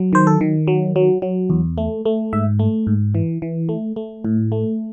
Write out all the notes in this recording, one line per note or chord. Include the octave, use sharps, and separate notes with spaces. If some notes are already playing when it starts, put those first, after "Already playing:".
Already playing: F#3
D#3 C5
A4
D#3
F#3
F#3
F#3
E2
A3
A3
G#2 E5
A3
G#2
E3
E3
A3
A3
A2
A3